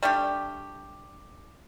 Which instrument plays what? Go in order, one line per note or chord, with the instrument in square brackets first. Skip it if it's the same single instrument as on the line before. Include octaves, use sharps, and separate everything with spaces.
[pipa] G3 A3 D4 G4